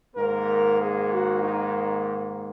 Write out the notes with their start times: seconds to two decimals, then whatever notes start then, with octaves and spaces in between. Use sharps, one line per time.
0.15 G#2 D#3 A#3 A#4
0.79 G#4
1.10 F#4
1.43 D#4